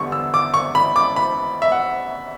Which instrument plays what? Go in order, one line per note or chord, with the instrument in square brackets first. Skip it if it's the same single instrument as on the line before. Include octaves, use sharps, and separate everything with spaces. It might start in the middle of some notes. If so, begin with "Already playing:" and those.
Already playing: [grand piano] E2 D3 G3 B3 C#6
E6
D6
C#6
B5
D6
B5
E5
F#5